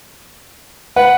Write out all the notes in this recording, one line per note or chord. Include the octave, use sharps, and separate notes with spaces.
B4 F#5